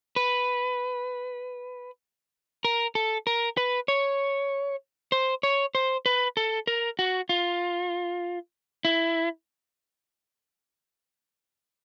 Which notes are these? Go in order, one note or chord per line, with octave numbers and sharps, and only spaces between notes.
B4
A#4
A4
A#4
B4
C#5
C5
C#5
C5
B4
A4
A#4
F#4
F4
E4